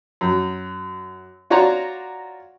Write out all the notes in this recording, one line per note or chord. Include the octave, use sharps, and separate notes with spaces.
F#2
F4 F#4 C#5 D5 A#5 C6